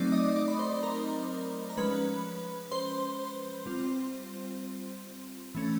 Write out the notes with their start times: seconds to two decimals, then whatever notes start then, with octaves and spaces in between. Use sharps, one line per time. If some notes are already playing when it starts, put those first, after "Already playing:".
Already playing: F#3 A3 C4 D#4 D5 D6
0.12 D#5 D#6
0.36 D5 D6
0.48 B5
0.59 C5 C6
0.83 A#4 A#5
1.70 A#5
1.77 F3 G#3 C#4 B4 B5
2.71 C5 C6
3.66 G3 C4 F4
5.55 E3 A3 C#4